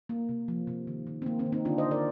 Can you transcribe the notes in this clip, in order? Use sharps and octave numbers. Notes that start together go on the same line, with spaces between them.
A#3
C3
F3
C3
D#3
D#3
C4
A#3
C4
D#3
C4 D#4
D3 D4 F4
C5 D#5
D3
A#4 D5